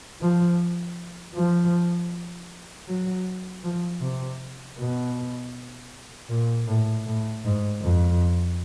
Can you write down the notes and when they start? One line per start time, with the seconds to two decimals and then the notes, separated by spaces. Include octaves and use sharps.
0.21 F3
1.35 F3
2.88 F#3
3.64 F3
4.01 C3
4.78 B2
6.30 A#2
6.68 A2
7.06 A2
7.45 G#2
7.82 F2